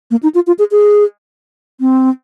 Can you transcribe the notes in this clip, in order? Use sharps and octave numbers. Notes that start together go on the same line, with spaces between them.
A#3
D#4
F4
F4
G#4
G#4
C4